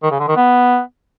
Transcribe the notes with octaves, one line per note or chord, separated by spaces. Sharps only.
D#3
C#3
D3
D#3
B3